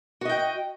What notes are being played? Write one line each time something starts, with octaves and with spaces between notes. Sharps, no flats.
F#4 D#5 G5